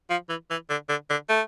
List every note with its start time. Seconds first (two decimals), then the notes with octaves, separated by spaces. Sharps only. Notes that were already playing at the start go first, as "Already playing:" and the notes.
0.10 F3
0.29 E3
0.50 E3
0.70 D3
0.89 D3
1.10 D3
1.29 A3